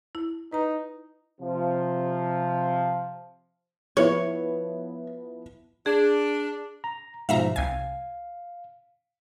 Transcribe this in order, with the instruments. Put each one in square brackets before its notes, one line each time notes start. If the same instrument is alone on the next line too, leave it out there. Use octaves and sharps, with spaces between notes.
[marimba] E4
[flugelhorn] D#4 [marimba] B4 A#5
[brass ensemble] C3 F3
[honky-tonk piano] F3 B3 E4 [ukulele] C#5
[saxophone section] D4 [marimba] G#4
[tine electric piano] A#5
[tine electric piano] G#2 B2 F3 [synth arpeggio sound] E5 F5 A#5
[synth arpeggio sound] C2 G#5 [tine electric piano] F5